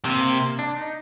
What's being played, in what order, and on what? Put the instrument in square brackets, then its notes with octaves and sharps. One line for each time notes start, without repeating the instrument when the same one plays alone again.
[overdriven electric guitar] C3 [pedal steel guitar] A#3
[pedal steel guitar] D4
D#4